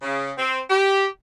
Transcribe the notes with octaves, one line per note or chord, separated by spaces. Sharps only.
C#3
C4
G4